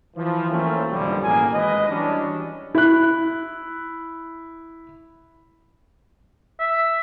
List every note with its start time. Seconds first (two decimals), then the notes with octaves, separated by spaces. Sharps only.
0.16 E3 F3
0.50 E3 F#3 A3 A#3 C4 C#4
0.91 B1 F2 A#2 D3 F3 G3
1.23 A1 G2 F#3 A#3 G#4 G#5
1.54 G#1 G#3 G#4 B4 D#5
1.89 E3 F#3 G3 C#4 D4
2.75 E4 F#6
6.60 E5